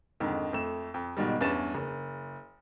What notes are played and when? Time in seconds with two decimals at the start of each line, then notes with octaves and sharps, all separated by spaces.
0.20 F2 G#2 D3 D#3
0.53 F2 A3 E7
0.94 F2
1.17 G#2 B2 D#3 G3
1.41 E2 G2 C#4 B4 A6 E7
1.75 F#1